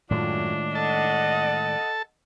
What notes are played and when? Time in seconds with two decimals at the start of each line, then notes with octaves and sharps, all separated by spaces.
0.11 F#2 A2 D#3 G#3 D4 F4
0.75 A4 D#5 F#5 A5